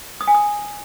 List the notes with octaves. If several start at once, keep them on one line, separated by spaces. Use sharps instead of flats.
D#6
G#5
D#6